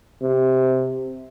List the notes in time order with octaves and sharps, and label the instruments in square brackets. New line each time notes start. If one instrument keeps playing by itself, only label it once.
[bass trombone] C3